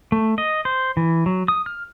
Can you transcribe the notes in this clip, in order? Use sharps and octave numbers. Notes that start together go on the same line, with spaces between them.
A3
D#5
C5
E3
F#3
D#6
F6